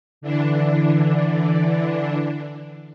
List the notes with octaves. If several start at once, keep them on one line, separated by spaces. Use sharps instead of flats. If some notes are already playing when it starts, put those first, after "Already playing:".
D3 E3 D4